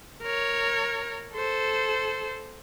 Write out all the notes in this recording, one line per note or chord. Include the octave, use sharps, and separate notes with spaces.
A#4 C#5
A4 C5